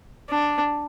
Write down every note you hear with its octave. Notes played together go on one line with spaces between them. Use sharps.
D4